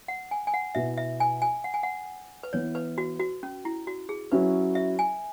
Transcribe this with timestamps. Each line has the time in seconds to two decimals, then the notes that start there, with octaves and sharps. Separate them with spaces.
0.08 F#5
0.31 G#5
0.47 G#5
0.54 F#5
0.75 B2 B3 E4 E5
0.98 E5
1.20 G#5
1.42 G#5
1.64 F#5
1.74 G#5
1.83 F#5
2.43 B4
2.53 E3 B3 E4 C#5
2.75 B4
2.98 F#4
3.20 F#4
3.43 C#4
3.65 E4
3.87 F#4
4.09 G#4
4.32 F#3 C#4 E4 B4
4.75 E5
4.99 G#5